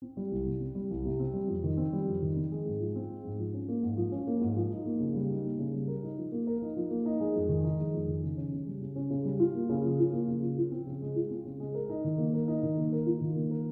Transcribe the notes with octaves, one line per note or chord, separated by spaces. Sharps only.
C4
G3
C2
C3
C4
G3
C2
C3
C4
G3
F2
D#3
C4
G3
F2
D#3
C4
G#3
G#2
F3
C4
G#3
G#2
F3
C#4
A#3
G#2
F3
C#4
A#3
G#2
F3
D#4
A#3
C#3
G3
D#4
A#3
C#3
G3
A#4
D#4
F3
A#3
A#4
D#4
F3
A#3
D#4
G#3
F2
D#3
D#4
G#3
F2
D#3
C#3
C#4
C#3
G3
C#3
C#4
C#3
G3
F4
A#3
C#3
F3
F4
A#3
C#3
F3
F4
C4
C#3
G#3
F4
C4
C#3
G#3
A#4
D#4
D#3
A#3
A#4
D#4
D#3
A#3
A#4
F4
D#3
A#3
A#4